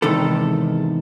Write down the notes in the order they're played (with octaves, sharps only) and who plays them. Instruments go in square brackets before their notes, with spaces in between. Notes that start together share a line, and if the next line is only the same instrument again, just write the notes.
[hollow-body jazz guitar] E2 G#2 C3 D#3 A4